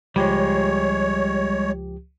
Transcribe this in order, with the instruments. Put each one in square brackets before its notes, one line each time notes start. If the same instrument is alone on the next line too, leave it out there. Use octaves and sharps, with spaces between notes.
[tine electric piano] C#2 F3 G4 [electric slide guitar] G3 G#3 [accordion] C#5